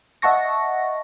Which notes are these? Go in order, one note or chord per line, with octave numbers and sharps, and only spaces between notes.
D#5 E5 F#5 A5 C#6 A#6